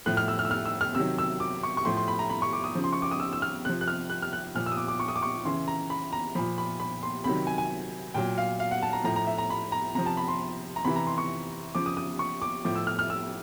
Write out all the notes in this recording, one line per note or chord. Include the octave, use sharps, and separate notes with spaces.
A2 F3 F#6
F6
E6
F6
E6
F6
E6
F6
C3 D#3 F#3 E6
E6
D6
C#6
C#6
A2 F3 C6
C6
B5
A#5
B5
C#6
D6
D#6
C#3 F3
C6
C#6
D6
D#6
E6
E6
F6
C3 F3 F#6
F#6
F6
F#6
F6
F#6
A#2 F3 F6
E6
D#6
D6
D6
C#6
D#6
D6
C#6
C#3 E3 C6
A#5
B5
A#5
A#2 F3 B5
B5
B5
C6
C3 D#3 F#3 B5
G#5
G#5
A#2 F#3 G5
F5
F5
F#5
A5
A#5
A2 F3 A#5
A#5
E5
A#5
B5
A#5
C3 F3 A#5
A5
B5
C6
A#5
C3 E3 B5
A#5
C6
C#6
C#3 F3 D6
D#6
D#6
C#6
D6
A2 F3 D6
E6
F6
F6
E6